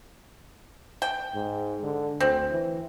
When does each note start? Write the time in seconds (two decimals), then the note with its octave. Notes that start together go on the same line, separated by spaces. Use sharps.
1.02 G5
1.35 G#2
1.83 D3
2.20 D2 C4
2.51 E3